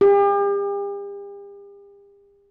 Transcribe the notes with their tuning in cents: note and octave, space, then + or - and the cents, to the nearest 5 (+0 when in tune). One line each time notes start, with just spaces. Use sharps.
G4 +40